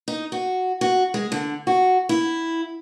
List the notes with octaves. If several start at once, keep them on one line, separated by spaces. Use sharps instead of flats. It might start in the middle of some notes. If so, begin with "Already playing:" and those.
D#4
F#4
F#4
G#3
D3
F#4
E4